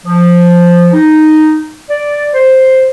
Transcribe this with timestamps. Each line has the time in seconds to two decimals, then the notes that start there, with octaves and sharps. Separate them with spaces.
0.05 F3
0.92 D#4
1.89 D5
2.34 C5